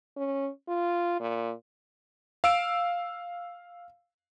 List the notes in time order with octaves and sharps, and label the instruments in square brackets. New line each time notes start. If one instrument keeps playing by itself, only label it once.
[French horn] C#4
F4
A#2
[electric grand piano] F5 E6 D7